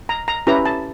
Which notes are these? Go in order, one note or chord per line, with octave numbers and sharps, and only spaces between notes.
A#5
A#5
C#4 E4 G4 B4 A#5
A5